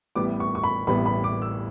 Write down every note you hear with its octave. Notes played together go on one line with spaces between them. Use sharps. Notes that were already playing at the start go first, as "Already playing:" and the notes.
A1 A2 G3 B3 D6
C#6
C#6
B5
A1 A2 G3 B3 B5
B5
D6
E6